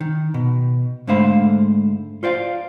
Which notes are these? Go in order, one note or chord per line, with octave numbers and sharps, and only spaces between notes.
D#3
B2
G#2 D3 A3 C5 F5 B5
F4 C5 D5 F5